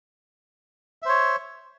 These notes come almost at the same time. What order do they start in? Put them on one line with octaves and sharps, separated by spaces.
E5 C5 C#5